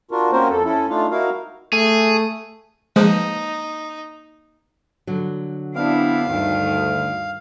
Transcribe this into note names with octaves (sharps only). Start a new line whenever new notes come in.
D4 F4 F#4 A#4
A#3 C4 C#4 F#4 A#4 C5
F2 A4
C#4 E4 A4
A3 D4 D#4 F4 F5
D#4 E4 F#4 A#4 F5
A3 G#4
F3 G#3 A#3 D#4 B4
D3 F#3
B3 C4 D4 E4 F5
D2 G2 D#3